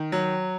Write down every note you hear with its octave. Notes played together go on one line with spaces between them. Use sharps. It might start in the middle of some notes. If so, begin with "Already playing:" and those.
Already playing: D#3
F#3